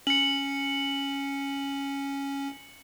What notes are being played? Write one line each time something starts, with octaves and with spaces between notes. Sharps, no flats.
C#4 C#7 F#7